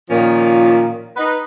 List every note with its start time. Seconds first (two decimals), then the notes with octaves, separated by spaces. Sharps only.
0.10 A#2 D#3 F3 A#3 C#4
1.17 D#4 B4